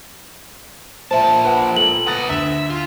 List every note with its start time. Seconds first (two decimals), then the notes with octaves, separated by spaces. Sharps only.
1.11 A#2 C5 E5 A5
1.45 B4 F#5
1.76 A4 F#7
2.07 B3 A#5 D#6 F#6 A6
2.30 D2 E5 E7
2.70 F4